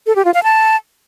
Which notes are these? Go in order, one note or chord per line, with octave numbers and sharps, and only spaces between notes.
A4
G4
F4
F5
A5